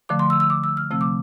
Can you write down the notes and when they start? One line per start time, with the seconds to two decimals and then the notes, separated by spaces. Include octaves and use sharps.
0.09 D3 F3 A3 D6
0.19 C6
0.30 E6
0.40 E6
0.50 D6
0.64 E6
0.77 F6
0.91 C3 F3 A3 C4 E6
1.01 D6